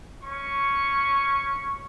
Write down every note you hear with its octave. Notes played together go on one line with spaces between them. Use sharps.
C#4 C#6